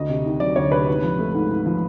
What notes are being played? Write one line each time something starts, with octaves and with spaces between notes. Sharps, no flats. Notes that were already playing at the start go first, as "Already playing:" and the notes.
Already playing: D2 D3 D#5
C3
D#3
F#3 D5
D2 C#5
C3 B4
G#2
F3
A3
G#2
G#2
F3